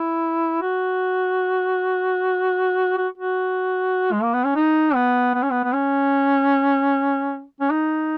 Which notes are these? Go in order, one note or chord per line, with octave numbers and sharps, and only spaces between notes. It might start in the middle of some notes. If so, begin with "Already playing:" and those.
Already playing: E4
F#4
F#4
F#4
G#3
A#3
B3
C#4
D#4
B3
B3
C#4
B3
B3
C#4
C#4
D#4